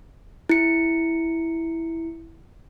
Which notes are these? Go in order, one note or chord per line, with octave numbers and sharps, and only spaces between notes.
E4 C#7